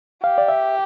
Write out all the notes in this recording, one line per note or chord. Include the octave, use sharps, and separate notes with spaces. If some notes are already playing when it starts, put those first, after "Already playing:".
G4 F5
D5
E5